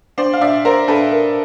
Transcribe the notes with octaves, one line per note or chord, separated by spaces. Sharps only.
D4 C5 D5
F5
D4 D5 E5
A#4 C5 D5
D4 A4 B4
A#4